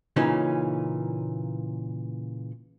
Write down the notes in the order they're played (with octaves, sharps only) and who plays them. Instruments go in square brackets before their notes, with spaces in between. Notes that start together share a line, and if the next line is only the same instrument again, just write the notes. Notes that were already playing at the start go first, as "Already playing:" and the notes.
[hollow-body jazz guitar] A#2 C#3 E3 C#4 D#4